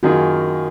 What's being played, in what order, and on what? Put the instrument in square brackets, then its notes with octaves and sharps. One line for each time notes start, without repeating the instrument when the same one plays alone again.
[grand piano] F#2 D#3 A#3 F4 G#4 [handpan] F#4